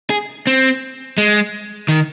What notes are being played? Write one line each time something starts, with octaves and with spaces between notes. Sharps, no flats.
G#4
C4
G#3
D#3